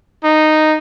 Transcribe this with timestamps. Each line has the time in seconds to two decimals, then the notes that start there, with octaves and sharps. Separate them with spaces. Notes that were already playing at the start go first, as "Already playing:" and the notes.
0.24 D#4